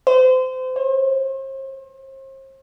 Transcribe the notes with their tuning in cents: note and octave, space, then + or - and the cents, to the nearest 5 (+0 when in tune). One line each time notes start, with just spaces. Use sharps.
C5 -30
C5 +40